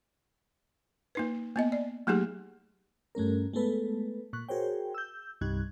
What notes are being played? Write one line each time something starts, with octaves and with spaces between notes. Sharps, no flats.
A#3 D#4 B4
A#3 B3 D#5
D5
F#3 A3 A#3 D#4 G4 G#4
G2 A3 C#4 A#4
G#3 A3 B3 A4 B4
A#2 C#6 F#6
F#4 G#4 A#4 C5 C#5 G5
E6 G6
C2 G2 G3 D#4 F#6 G#6